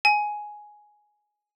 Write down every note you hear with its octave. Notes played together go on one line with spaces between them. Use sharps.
G#5